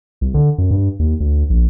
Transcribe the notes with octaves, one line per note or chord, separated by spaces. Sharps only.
C2
D3
F#2
G2
D#2
D2
A#1